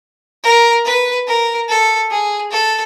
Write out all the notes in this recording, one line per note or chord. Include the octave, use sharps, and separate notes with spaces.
A#4
B4
A#4
A4
G#4
A4